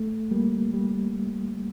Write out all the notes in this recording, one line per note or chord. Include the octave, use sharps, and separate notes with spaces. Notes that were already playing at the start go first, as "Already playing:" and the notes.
Already playing: A3
G3 A#3
G3